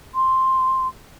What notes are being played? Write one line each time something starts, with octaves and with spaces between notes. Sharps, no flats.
C6